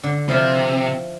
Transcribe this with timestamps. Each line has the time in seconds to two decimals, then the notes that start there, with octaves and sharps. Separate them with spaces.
0.03 D3
0.28 C3 F3 E4 F4